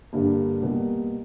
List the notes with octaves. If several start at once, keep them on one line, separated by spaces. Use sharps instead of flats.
G2 D3 G3 A#3
B2 G3 A#3